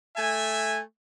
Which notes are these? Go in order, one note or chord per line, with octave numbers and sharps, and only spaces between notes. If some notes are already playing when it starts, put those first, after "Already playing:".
A3 E5 G#5